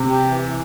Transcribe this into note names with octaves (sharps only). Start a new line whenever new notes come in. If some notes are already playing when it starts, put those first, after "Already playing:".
Already playing: C3
G4
E3
E3